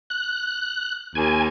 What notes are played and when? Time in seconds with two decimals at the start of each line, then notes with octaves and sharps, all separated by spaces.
0.10 F#6
1.15 D#2 G#5